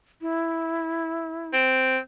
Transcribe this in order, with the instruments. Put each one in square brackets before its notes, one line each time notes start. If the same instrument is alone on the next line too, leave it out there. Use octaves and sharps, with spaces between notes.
[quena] E4
[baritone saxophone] C4